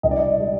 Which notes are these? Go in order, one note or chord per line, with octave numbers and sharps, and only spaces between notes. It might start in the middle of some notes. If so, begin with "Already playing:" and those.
C2 D#5
D5
D#5
G3